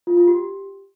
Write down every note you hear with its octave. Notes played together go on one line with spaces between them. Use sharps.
F4
F4
G4